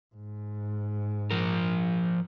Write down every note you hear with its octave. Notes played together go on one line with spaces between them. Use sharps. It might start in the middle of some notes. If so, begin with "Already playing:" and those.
G#2
F3 A#4